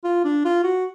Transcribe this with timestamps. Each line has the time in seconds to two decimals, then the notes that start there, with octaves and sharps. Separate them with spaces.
0.04 F4
0.24 D4
0.45 F4
0.64 F#4